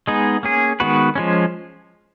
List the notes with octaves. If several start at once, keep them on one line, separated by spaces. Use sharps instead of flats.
G#3 B3 D#4 G#4
A#3 C#4 G#4
D#3 G#3 B3 F#4 B4
F3 G#3 C#4